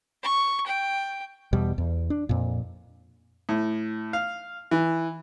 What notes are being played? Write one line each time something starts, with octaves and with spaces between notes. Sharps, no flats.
C#6
G5
E2 B2 G3
E2
D4
F2 A#2
A2
F5
E3